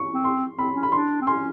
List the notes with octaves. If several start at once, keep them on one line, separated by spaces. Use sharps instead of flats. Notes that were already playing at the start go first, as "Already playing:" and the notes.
Already playing: C#6
C4
C6
C4 B5
C#4
B5
D4 C6
C4
C#4 C6